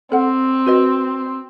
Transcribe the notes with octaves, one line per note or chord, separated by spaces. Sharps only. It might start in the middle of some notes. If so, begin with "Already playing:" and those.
C4 A4 F#5
F#4 B4 D#5